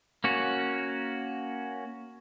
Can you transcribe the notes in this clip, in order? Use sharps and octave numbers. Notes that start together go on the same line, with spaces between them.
A#3 C#4 F#4